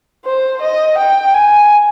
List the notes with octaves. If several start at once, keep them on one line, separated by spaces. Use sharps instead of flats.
C5
D#5
G5
G#5